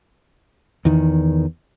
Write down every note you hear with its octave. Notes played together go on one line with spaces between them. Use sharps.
E2 D#3